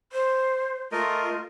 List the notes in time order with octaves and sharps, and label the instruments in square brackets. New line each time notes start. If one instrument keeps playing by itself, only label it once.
[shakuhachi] C5
[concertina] A3 A#4 D#5 [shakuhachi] F4